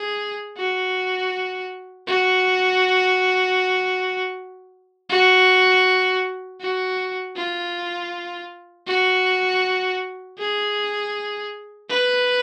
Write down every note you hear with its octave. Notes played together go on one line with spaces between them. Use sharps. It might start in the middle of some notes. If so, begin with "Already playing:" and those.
Already playing: G#4
F#4
F#4
F#4
F#4
F4
F#4
G#4
B4